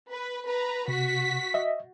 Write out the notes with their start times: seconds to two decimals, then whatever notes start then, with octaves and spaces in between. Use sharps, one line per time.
0.10 B4
0.47 B4 A#5
0.88 C3 F#4 B6
1.54 D#5 E5